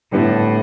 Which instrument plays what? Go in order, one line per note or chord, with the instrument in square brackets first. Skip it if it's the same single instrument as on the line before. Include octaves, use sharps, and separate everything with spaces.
[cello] A2 [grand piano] D3 G3 B3 E4 G4